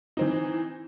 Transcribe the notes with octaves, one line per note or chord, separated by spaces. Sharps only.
E3 C4 D#4